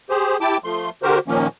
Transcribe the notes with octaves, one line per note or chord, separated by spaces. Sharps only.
G4 G#4 C5
E4 G4 G5 A5 D6
F3 A3 C6
D3 F#4 G4 A#4 C5
A#2 D#3 F3 A#3 C#4